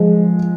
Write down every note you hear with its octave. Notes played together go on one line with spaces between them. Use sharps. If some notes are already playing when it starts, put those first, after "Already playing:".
Already playing: F3 G#3